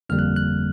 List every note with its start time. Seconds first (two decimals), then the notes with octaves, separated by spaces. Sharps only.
0.09 G1 F2 D3 G3 A#3 F6
0.19 F#6
0.36 F#6